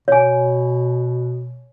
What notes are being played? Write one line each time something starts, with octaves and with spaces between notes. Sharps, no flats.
B2 C#5 G#5